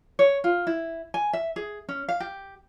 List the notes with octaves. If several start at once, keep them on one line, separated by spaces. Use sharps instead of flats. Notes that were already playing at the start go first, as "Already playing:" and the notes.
C#5
F4
E4
G#5
E5
G#4
C#4
F5
G4